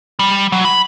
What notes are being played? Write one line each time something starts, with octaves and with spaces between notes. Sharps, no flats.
G3
F#3
B5